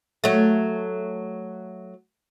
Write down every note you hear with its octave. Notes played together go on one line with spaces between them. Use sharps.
F#3 A3